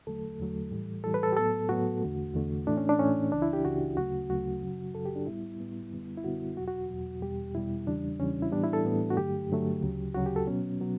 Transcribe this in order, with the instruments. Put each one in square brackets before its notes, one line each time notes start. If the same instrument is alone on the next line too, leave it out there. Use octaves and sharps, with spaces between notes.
[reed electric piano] E2 D3 F#3 A3 A4
E2 D3 F#3 A3
A2 E3 G3
A2 E3 G3 A4
B4
A4
G4
A2 F#3 B3 A4
A2 F#3 B3 F#4
E2 D3 A3
E2 D3 A3
A2 E3 A3 D4
C#4
D4
A2 E3 A3 C#4
C#2 C#3 E3 D4
E4
G4
C#2 C#3 E3 F#4
D2 C#3 F#3 A3 F#4
D2 C#3 F#3 A3 F#4
F#2 C#3 F#3
F#2 C#3 F#3 A4
G4
D4
A2 G3 B3 E4
A2 G3 B3
F#2 D3 G3 B3
E4
F#2 D3 G3 B3 F#4
E2 B2 F#3 F#4
F#4
E2 B2 F#3
E2 B2 G3 G4
E2 B2 G3 E4
E2 C#3 E3 G3 D4
E2 C#3 E3 G3 C#4
E4
A2 E3 G3 B3 D4
E4
A4
A2 E3 G3 B3
F#4
G2 D3 F#3 A3 G4
G2 D3 F#3 A3
D2 C#3 F#3
D2 C#3 F#3 F#4
G4
A4
B2 F#3 B3 C#4
B2 F#3 B3